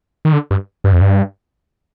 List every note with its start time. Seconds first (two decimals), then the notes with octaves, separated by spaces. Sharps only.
0.25 D#3
0.33 D3
0.51 G2
0.84 G2
0.93 F2
1.01 G2